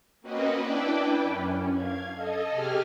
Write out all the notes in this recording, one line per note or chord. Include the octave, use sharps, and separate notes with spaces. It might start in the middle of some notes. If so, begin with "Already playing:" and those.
A#3 C4 C#4 F#4 B4 D#5
D4 E4 B4 D5 G5
F#2 C#4
F5 G#6
A4 D#5
C3 G4 G#4 G#5 F6